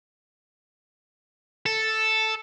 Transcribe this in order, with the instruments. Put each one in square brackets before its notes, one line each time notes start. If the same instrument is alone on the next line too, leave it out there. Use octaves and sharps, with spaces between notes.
[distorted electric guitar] A4